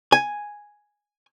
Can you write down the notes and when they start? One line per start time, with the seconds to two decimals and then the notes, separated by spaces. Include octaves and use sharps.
0.12 G#5